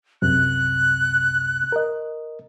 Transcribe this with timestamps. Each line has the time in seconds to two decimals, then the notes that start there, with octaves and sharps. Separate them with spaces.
0.22 C2 F#2 C3 F#6
1.72 A#4 D#5